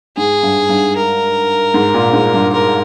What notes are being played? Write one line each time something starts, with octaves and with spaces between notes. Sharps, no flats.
G#2 G#4
G2
G2
A#4
G#2
A#2
G#2
G2
A#4